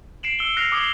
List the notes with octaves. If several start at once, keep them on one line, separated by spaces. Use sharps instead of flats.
C7 D7 E7 F#7
E6 C#7 G7
F6 F#6 A#6 C7 C#7 F7
D6 D#6 G#6 C7 F#7